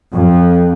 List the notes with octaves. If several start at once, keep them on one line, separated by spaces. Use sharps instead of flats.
F2